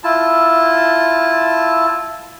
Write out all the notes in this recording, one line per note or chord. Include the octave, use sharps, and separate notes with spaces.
E4 F4 A5